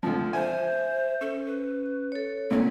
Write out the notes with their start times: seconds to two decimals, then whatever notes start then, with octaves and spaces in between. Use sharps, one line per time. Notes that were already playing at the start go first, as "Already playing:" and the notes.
0.03 D2 F3 C4
0.33 C5 E5 G#5
1.21 C#4 A4
1.46 B4
2.12 A4 C#5
2.51 A#2 D3 C4 C#4